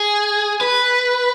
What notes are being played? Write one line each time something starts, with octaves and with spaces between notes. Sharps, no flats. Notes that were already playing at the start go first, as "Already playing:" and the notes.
Already playing: G#4
B4